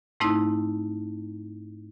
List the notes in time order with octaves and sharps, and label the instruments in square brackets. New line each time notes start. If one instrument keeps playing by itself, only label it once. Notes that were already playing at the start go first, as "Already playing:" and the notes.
[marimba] G#2 A3 C4 D#4 E4